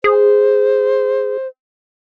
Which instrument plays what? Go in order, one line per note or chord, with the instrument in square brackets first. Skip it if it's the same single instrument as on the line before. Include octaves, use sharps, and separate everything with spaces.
[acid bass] G#4 [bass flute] C5